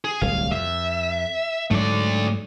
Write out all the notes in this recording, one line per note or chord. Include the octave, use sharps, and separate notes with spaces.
G#4
D1 C2 F5
F2 E5
G#2 F#3 A3 D5